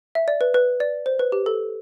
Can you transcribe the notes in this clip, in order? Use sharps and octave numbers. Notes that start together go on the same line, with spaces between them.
E5
D5
B4
B4
D5
C5
B4
G4
A4